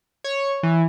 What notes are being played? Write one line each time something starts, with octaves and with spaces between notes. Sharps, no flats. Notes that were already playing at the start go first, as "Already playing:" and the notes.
C#5
E3